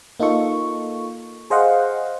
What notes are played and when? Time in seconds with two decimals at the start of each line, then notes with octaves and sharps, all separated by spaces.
0.20 A#3 D#4 F4 A4 C#6
1.50 G#4 C5 D#5 F5 F#5